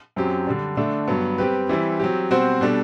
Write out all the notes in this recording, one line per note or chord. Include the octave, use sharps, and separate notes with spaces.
F#2 F#3 C4 G4
D3 G3 D4
D3 A3 D4
G2 F#3 B3
G3 C4 G4 B4
E3 G3 C4 E4
F#3 C4 G4
B2 G3 C4 F#4 C5
B2 G3 D4 A4